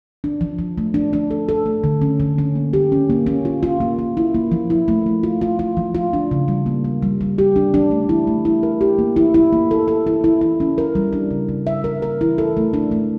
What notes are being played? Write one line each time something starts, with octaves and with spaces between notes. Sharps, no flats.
D4
F3
F3
A3
D4
D4
A4
A4
A3
D3
C#4
D3
C#4
A#3
G4
C#4
A#3
C#4
F4
F4
A#3
A#3
E4
A#3
F3
E4
A3
A3
F4
F4
F4
F3
F4
D4
C#3
G3
A#3
A#3
G3
G3
G4
D4
D4
A3
E4
A3
E4
A#4
G4
A#3
E4
E4
A#3
A4
A4
E4
E4
E4
C#4
A#4
G3
D4
C#3
C#3
E5
A#4
A#4
E4
A4
A3
D4
A3